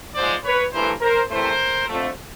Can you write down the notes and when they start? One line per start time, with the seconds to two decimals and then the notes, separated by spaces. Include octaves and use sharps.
0.14 G#2 F3 G#3 C5 D5
0.43 B4 C#5
0.72 G2 E3 A3 A#4 C5
1.00 A#4 C5
1.29 E2 C3 E3 A3 A#4 C5
1.86 F2 D3 F3 A3